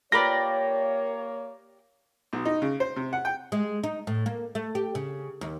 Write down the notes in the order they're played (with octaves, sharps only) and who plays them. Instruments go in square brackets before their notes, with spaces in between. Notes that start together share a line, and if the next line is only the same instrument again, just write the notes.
[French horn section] A#3 C#5 [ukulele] F4 A#4 B4 [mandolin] G4 D5 [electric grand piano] A#6
[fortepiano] B1
D#4
C#3
C5
C3
F#5
G5
[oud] G#3
D#4
A2
A#3
A3
G4
C#3
D#2